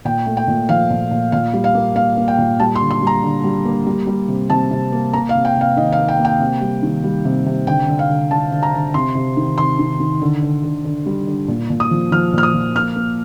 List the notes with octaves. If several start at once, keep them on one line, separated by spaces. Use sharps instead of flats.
A#2 G5
A3
G5
A#2
F3 F5
A#2
A#2
A#2 F5
G3
F5
A#3
A#3 F5
A#3
G5
A#2
G3 A5
C6
D3
C6
G3
A#5
D3
G3
A#3
G3
G3
C3
C3 A5
C3
A#3
A#3 A#5
F5
C3
G5
C3
F5
D#3 D#5
F5
A#3
G5
A#3
G5
C3
G3
D#3
G3
C3
C3
D3 G5
D3
F5
D3
D3 A5
D3
A#5
D3
C3 C6
C3
D#3
C3 C6
D#3
D#3
D3
D3
D3
D3
G3
D3
A#2
A#2
D#6
F3
F3 F6
A#2 F6
D#6
F3
A#3 F6
A#3